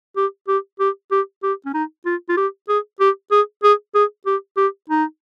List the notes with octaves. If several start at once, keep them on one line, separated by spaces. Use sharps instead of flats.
G4
G4
G4
G4
G4
C#4
D#4
F4
F4
G4
G#4
G4
G#4
G#4
G#4
G4
G4
D#4